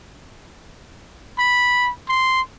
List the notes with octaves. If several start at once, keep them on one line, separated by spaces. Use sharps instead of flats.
B5
C6